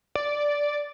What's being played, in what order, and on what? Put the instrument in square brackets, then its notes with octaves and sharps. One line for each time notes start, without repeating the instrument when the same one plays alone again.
[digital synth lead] D5